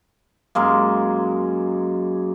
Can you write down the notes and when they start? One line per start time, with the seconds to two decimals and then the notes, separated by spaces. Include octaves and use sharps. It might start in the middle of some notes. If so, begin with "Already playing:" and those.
0.55 F#2 G#3 A#3